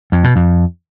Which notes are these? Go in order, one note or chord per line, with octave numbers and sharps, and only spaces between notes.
F2
B2
F2